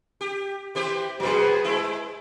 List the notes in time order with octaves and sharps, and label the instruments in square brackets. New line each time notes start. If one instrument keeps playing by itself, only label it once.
[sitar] G4
E3 G4 C5
[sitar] B2 F#3 [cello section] G#4 B4 C5
[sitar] G#3 E4